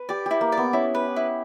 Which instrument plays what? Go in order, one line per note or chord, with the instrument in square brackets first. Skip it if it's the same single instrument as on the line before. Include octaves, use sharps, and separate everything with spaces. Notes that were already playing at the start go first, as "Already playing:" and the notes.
Already playing: [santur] B4
[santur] G4 [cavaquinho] D5
[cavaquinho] E4 [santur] G4
[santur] A#3
[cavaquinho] D5
[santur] B3
[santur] C#4 [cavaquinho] E4
[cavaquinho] B4
E4